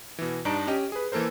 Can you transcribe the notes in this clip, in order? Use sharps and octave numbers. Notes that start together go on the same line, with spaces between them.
B2 E3
G2 D4 D#4 A5 A#5 D7
C#4 G4 D#5
G#4 B4
E3 A#3 A4 A#4 C5